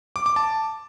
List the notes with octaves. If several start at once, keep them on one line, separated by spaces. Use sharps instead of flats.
D6
D6
A5